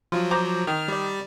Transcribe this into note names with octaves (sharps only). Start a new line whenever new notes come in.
F3 F#3 F4 C6
C5 A#5 D6
D#3 F6
G3 D5